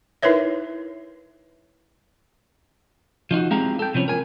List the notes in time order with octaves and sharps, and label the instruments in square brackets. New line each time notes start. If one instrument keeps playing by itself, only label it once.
[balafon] D#4 E4 A#4 B4 C#5 E5
[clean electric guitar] F3 D#4 F4 F#4
G#3 C4 E4 G4 F5 A#5
A4 G5
C3 F3 G3 C#4
A#4 G#5